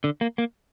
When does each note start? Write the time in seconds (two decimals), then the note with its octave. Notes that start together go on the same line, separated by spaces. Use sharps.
0.04 D3
0.21 A#3
0.38 A#3